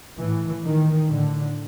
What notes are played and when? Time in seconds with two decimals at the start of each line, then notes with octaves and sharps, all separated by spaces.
0.19 A2 E3
0.65 D#3
1.08 A2 D3